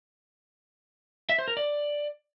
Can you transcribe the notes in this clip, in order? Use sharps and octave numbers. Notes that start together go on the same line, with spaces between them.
E5
C5
A#4
D5